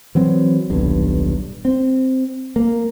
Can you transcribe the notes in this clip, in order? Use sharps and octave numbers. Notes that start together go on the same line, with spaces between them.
E3 F#3 C4
D#1 B1 G2
C4
A#3